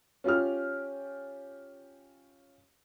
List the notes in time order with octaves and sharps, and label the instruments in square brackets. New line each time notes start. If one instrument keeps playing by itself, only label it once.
[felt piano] C#4 F4 G4 F6